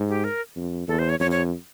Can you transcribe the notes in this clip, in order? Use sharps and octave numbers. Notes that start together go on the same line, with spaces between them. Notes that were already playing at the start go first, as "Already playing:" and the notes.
Already playing: G#2
G4
A#4
F2
E2 A4
C5
C#5
F2 C#5
C#5